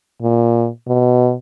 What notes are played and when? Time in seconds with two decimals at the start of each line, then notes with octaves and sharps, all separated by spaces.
0.22 A#2
0.87 B2